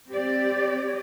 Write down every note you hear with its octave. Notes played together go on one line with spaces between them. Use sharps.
C4 G4 D5